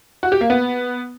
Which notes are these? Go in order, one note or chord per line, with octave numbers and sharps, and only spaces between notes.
F#4
G4
A#3
B3